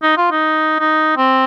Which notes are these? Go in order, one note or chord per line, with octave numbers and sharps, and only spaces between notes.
D#4
F4
D#4
D#4
C4